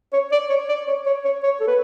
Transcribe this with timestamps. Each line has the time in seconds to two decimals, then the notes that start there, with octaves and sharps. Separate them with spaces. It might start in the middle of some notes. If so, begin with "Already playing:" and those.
0.13 C#5
0.32 D5
0.49 C#5
0.69 D5
0.87 C#5
1.06 C#5
1.25 C#5
1.43 C#5
1.60 A4
1.67 B4